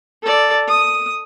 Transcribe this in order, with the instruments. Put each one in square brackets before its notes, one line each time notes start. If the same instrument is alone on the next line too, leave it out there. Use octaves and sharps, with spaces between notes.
[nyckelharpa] A4 D5
D#6